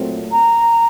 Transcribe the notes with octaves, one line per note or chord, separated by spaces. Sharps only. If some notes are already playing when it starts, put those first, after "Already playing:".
Already playing: A#2 F#3 A3 C4
A#5